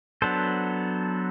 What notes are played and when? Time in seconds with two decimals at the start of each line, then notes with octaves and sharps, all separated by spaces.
0.22 F#3 B3 D4 A4 C5